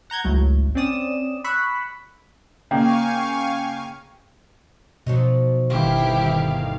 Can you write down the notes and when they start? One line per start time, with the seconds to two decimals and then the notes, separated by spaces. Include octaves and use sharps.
0.10 F#5 A#5 G6 G#6
0.24 G#1 C#2 A2 F#3
0.75 C4 C#4 D5 D#6 E7
1.44 B5 C#6 E6 F#6 B6
2.71 C#3 A#3 F5 G5 G#5 C#6
5.07 B2 F3 F#3 D#4
5.70 G1 D#3 C4 E4 G4 F5